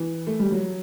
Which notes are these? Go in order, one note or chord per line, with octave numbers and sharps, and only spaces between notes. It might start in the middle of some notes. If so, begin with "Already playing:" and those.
Already playing: E3
A3
G3
F#3